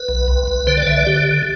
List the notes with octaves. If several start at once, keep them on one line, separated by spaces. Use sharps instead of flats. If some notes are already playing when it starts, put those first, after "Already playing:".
Already playing: B4
B1
C2
C2
D3 C5
D5
D3 E5
D5
D3 G4